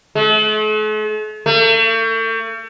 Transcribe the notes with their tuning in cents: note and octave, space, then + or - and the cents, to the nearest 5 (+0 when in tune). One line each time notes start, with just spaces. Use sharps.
A3 -45
A3 +40